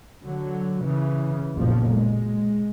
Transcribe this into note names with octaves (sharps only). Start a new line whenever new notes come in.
D3 F#3
C#3 E3
F#1 B1 F2 A#2 F3
G#3